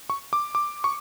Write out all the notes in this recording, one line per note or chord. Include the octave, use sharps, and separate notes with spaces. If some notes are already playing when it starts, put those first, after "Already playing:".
C#6
D6
D6
C#6